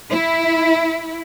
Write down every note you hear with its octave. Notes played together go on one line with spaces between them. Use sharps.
E4